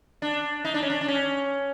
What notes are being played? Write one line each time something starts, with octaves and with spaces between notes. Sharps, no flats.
D4
D#4
D4
C#4
D4
D4
C#4